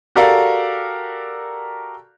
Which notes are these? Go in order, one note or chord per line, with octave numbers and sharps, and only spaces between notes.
F#4 G4 A4 A#4 D5 F5